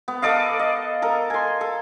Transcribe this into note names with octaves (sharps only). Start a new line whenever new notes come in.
B3
A4 D5 D#5 F5
D#5
A4 A#4
G#5 C6
A4